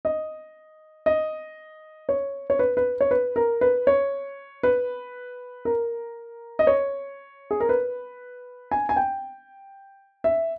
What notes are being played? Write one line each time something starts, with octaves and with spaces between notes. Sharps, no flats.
D#5
D#5
C#5
C#5
B4
B4
C#5
B4
A#4
B4
C#5
B4
A#4
D#5
C#5
G#4
A#4
B4
G#5
G#5
G5
E5